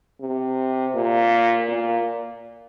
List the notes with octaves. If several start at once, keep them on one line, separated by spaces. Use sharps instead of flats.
C3
A#2
A#2